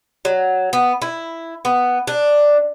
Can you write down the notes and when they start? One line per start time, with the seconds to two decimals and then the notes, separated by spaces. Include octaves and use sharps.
0.25 F#3
0.73 B3
1.02 E4
1.65 B3
2.07 D4